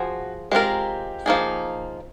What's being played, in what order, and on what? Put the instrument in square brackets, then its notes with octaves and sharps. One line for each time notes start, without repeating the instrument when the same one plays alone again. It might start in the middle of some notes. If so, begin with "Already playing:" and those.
Already playing: [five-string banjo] F3 G#4 C5 [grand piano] F#4
[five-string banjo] G#3 C4 F4 A#4 [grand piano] G4
[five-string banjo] F3 A#3 D#4 G#4